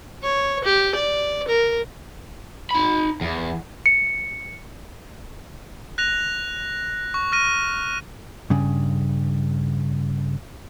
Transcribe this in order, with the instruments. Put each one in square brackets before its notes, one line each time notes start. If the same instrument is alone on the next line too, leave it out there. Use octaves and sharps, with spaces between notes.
[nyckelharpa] C#5
G4
D5
A#4
[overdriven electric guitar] D#4 B5
E2
[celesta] C#7
[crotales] F#6 A#6 F7
C#6
F6 A#6 D#7
[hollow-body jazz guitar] G2 C#3